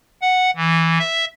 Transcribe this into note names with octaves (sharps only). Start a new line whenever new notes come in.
F#5
E3
E5